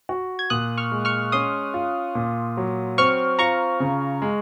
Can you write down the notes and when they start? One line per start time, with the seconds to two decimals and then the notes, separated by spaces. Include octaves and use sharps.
0.09 F#4
0.39 G#6
0.50 A#2 D#6 F#6
0.77 C#6 F6
0.92 G#3
1.05 C#6 F6
1.32 C#4 C6 D#6
1.74 F4
2.15 A#2
2.57 F#3
2.98 C4 C#6 F6
3.39 F4 A#5 C#6
3.80 C#3
4.22 G#3